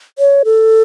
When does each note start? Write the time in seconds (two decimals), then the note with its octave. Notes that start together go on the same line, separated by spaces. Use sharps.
0.19 C#5
0.45 A4